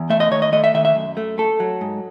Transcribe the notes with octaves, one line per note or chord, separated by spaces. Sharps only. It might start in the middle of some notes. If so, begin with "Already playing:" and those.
Already playing: E2
A3 E5
D#5
D#3 C#5
D#5
A3 D#5
E5
D#3 E5
E5
F#2
A3
A3 A4
F#3
G#2